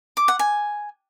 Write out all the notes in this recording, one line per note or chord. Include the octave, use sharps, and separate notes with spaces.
D6
F#5
G#5